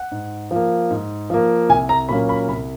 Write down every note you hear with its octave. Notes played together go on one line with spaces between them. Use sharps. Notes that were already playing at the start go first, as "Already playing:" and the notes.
Already playing: F#5
G#2
F3 A#3
G#2
F3 A#3
C2 G#5
A#5
A#2 F#3 A#3 C#4 B5
B5
C2 B5